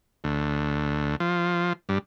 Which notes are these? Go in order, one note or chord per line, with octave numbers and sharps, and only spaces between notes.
D2
F3
G2